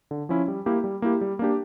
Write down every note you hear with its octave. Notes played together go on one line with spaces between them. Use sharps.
D3
F3 C#4 E4
G3
A#3 E4 G4
G3
A#3 E4 G4
G3
A#3 D4 G4